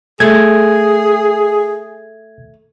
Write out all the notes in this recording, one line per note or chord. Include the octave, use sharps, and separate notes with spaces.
A3 G#4 G#6